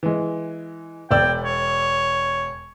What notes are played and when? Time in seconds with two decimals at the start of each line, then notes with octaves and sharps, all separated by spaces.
0.03 E3 G#3
1.11 E1 D5 G5 E6
1.45 C#5